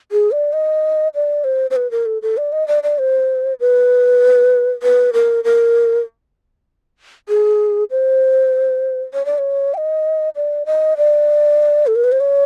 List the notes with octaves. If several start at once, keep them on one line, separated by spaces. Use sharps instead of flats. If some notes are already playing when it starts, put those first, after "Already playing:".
G#4
D5
D#5
D5
C5
C5
B4
A#4
A4
A4
D5
D#5
D5
D5
C5
B4
B4
A#4
A#4
G#4
C5
C#5
D5
C#5
G5
D#5
D5
D#5
D5
A4
A#4
B4
C5
C#5